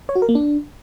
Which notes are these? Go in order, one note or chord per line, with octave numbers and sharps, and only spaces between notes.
C#5
F#4
A#4
A#3
D4